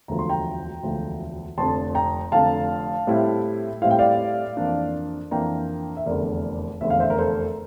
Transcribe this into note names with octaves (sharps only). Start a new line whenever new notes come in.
E1 D2 D3 F3 A#5
C6
G5 A#5
E1 D2 D3 F3
F1 F2 D3 A5 C6
G5 A#5
F1 F2 D3 F5 A5
A2 G3 C4 E4
A2 G3 C4 E4 F5
G5
D5 F5
F2 E3 A#3 D4
F2 E3 A#3 D4 G5 A#5
E5
F1 E2 D3 A#4 D5
F1 E2 D3 E5
F5
C5 E5
A#4
A4 C5